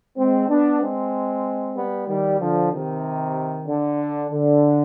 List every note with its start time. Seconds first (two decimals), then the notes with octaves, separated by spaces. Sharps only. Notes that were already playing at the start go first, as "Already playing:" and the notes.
0.17 G#3 C4
0.48 B3 D4
0.80 G#3 C4
1.75 G3 B3
2.07 D#3 G3
2.39 D3 F3
2.71 C3 D#3
3.67 D3
4.30 D3